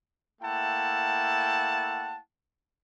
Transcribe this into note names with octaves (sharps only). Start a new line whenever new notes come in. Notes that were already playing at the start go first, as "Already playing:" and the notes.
A3 A#3 E4 F#5 G5 A5